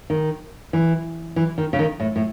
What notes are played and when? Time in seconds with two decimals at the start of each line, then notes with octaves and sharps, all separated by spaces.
0.10 D#3
0.73 E3
1.36 E3
1.58 D#3
1.73 C#3
1.79 D#3
2.00 A2
2.16 A2